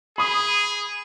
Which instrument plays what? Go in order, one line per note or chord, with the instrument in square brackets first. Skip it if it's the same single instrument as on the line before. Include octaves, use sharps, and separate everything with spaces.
[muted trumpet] G#4 [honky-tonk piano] B5 D#6